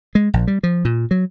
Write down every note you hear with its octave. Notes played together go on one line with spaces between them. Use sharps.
G#3
A#1
G3
F3
A#2
F#3